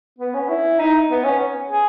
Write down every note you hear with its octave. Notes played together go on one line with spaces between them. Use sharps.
B3
C#4
E4
D#4
B3
C#4
G#4